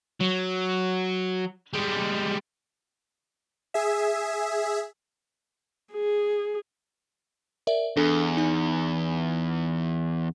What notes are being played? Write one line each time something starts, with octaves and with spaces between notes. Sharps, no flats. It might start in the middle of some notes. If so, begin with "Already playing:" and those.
F#3
G3 G#3
G#4 E5
G#4
A#4 D5 E5
E2 D4 A4
D#4 G#5